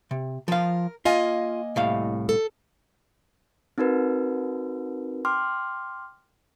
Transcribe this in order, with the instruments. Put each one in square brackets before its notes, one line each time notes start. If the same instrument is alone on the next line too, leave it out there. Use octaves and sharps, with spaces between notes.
[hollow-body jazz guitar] C3
[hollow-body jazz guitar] F3 F5 [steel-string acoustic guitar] A#4
[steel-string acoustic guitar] A#3 D#5 G#5 [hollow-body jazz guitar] F4
[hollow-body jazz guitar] C2 A2 F5
[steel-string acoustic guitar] A4
[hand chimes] C4 D#4 F#4 A#4 B4
G5 C6 D6 F6